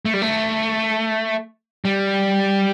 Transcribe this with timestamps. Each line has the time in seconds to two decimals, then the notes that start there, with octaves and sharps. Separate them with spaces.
0.05 A3
0.14 G3
0.22 A3
1.85 G3